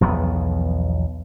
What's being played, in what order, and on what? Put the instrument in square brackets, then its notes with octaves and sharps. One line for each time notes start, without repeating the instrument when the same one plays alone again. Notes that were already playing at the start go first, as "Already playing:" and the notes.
[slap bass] B1 E2 F3 B3